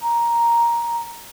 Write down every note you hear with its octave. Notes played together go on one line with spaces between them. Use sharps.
A#5